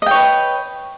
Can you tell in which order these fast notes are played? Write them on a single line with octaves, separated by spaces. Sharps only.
D#5 G5 C#5 B4